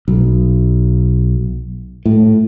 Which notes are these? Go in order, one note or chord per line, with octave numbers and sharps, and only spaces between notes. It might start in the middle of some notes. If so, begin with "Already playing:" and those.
B1
A2